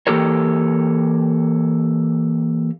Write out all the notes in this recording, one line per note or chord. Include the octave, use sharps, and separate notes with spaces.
E3 A#3 G4 A4 A#4 C#5